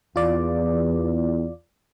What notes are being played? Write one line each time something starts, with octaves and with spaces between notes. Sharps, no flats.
E2 F4 D5